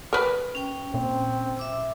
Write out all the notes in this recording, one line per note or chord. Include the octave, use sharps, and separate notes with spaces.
A#4 B4
C#4 G5
A#2 C4
E5 D6 E6